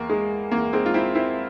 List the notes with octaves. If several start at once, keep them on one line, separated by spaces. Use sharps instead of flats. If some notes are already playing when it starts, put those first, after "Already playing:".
Already playing: E2 E3 A#3
G#3
E2 E3 A#3
G#3 C4
F4
C4 E4
C4 E4